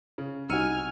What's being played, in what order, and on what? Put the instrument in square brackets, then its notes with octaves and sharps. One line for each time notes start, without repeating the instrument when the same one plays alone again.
[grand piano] C#3
[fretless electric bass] C2 [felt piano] D#4 F#4 [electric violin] G#5 F6 [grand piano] E6 C#7 D#7